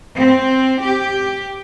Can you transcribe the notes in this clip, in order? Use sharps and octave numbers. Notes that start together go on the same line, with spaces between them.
C4
G4